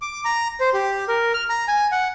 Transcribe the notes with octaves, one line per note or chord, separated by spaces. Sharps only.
D6
A#5
C5
G4
A#4
F6
A#5
G#5
F#5